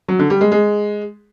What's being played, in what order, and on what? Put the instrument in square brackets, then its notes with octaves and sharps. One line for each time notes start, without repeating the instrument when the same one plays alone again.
[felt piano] F#3
D3
G3
G#3
G#3